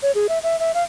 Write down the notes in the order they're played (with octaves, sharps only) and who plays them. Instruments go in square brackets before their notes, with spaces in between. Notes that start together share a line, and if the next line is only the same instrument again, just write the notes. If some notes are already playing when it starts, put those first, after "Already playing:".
[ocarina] C#5
G#4
E5
E5
E5
F5